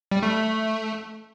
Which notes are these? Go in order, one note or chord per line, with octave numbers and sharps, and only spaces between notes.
G3
A3